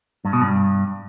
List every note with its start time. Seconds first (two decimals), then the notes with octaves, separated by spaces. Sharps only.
0.25 G2
0.33 B2
0.42 G2